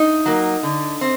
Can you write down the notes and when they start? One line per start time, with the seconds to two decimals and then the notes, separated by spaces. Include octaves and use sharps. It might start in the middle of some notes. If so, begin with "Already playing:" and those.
Already playing: D#4
0.26 F#3 A#3
0.63 D3
1.01 C4